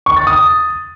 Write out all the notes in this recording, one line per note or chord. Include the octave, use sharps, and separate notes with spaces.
C#6
A6
D#6